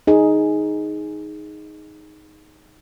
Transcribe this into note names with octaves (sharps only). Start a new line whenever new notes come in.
D#4 G#4